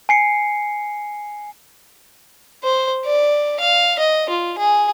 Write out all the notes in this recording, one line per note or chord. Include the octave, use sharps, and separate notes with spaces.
G#5 C7 C#7
C5
D5
F5
D#5
F4
G#4